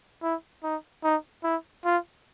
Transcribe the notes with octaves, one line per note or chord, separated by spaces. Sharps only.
E4
D#4
D#4
E4
F4